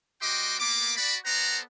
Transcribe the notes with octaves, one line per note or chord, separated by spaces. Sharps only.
G3 F#4 D#5 G5 C6 D6
A#3 B3 D6
F#4 D5 B5
B3 A4 C5 D5 F#5 A#5